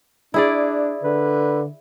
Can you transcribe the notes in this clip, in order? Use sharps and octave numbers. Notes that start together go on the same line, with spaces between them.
D4 E4 G#4 D5
D3 B4